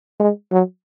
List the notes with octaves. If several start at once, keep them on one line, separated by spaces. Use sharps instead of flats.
G#3
F#3